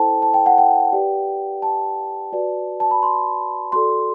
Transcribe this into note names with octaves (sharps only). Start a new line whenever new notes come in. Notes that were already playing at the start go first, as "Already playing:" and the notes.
Already playing: E4 A4 C5 G5 A5
A5
G5
F#5
G5
G4 B4 D5
A5
F#4 B4 D5
A5
B5
C6
F#4 A4 D5 C6